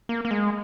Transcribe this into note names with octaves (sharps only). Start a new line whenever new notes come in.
A#3
A#3
G#3